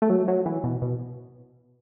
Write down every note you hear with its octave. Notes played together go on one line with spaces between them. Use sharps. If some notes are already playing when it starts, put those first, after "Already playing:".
A3
F#3
F#3
E3
B2
B2